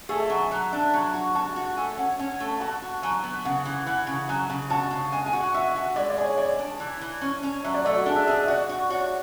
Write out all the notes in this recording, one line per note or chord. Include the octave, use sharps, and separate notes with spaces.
A3 G#4
E5
F#3 F#5
G#5
F#3
D4
F#3
F#4
F#4 A5
F#4
A3 G#5
C#4 F#5
C#4
A3
F#4 A5
F#4
F#3 G#5
B3
C#3 F#5
E3
E3 F#5
C#3
F#3 G#5
C#3
F#4 A5
C#3
G#3 G#5
G#5
F#4
F#5
F#4 E5
F#4
G#3 D5
D5
G#4
C#5
G#3 D5
D4
E3
E3
C#4
C#4
F#3 E5
D5
A3 D5
F#4
D4 G#4
E5
G#4 E5
E5
F#4 D5
F#4
F#4 C#5